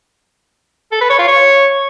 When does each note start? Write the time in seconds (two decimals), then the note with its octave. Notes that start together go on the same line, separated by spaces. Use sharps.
0.92 A4
1.01 B4
1.10 C#5
1.19 F4
1.28 C#5